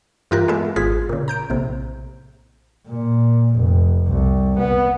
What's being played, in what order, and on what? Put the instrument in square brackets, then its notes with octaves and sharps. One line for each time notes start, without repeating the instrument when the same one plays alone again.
[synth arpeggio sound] G2 E3 F4 G4 A#4 F#6
G#3 A3 B3 E5
G#1 F4 G#4 B6
A#2 C#3
A#5 G6 D7
A#1 A2 C3
[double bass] A#2
F1
C2
B3